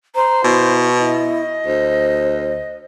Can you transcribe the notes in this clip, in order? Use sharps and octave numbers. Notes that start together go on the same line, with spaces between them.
C5 A#5
B2 E4
E4 D#5
D2 C5